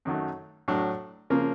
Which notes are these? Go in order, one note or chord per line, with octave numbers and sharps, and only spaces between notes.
F#2 D#3 F#3 A3
A2 F#3 A3 D4
C#3 F3 A#3